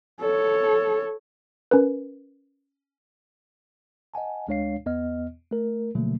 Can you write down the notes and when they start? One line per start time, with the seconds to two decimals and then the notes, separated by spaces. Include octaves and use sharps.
0.20 A4 C#5
1.71 C#4 A#4 B4
4.14 D#5 F#5 G#5 A5
4.48 D2 G#3 D4 C#5 F5 C7
4.86 E2 B3 D#5 F6
5.51 A3 A#4
5.95 B2 D3 F3 F#3 A3 A#3